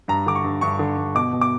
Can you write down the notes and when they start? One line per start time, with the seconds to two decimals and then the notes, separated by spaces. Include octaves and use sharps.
0.08 G2 A#5
0.26 D3 D6
0.35 C#6
0.44 G2
0.61 G2 C#6
0.79 D3
0.97 G2
1.15 B2 D6
1.33 B2
1.41 D6